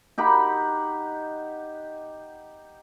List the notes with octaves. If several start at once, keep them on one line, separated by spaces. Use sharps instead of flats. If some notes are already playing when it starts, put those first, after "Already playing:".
D#4 G4 F#5 B5